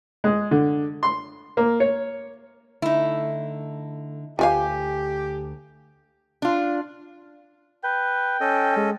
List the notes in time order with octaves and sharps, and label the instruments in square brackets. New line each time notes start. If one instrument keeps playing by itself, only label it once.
[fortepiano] G#3
D3
C6
A#3
C#5
[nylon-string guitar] D3 A3 [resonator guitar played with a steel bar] D#4 E4
[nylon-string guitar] D2 G#5 [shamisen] F4 B4 F5 [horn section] G4
[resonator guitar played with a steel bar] D4 F4
[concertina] B4 [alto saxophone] G5
[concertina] C#4 A4 D#5
[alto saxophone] G#3